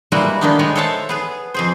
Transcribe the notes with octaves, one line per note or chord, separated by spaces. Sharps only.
G3 G#3 A#3 E4 F#4 B4
D3 D#3 A#3 B3 D4 D#4
G#3 D#4 B4 C#5
A4 C5 C#5 E5 F#5 A5
B3 G#4 B4
F2 G#4 C5